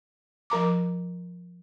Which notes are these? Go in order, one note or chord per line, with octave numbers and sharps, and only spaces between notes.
F3 A#4 A#5 D6